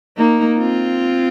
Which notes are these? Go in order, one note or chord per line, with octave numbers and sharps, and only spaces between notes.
A#3 D#4
C4 F4